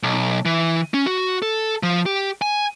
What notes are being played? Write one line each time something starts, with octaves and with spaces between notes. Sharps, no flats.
B1
E3
C#4
F#4
A4
F3
G4
G#5